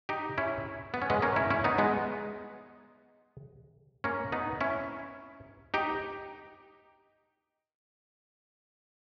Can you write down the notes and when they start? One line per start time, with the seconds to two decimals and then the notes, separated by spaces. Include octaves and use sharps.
0.09 D#4 G4
0.38 C#4 E4
0.94 B3
1.02 C#4
1.10 G#3 B3
1.22 A#3 C#4
1.36 C#4 E4
1.50 C#4 E4
1.64 B3 D#4
1.78 G#3 B3
4.04 A#3 C#4
4.32 B3 D#4
4.61 C#4 E4
5.74 D#4 G4